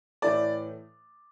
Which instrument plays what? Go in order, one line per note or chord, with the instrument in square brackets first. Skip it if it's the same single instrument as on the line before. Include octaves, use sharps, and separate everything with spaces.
[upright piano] A2 E3 A3 D5